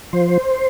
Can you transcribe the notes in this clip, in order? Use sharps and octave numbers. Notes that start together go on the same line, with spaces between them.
F3 C5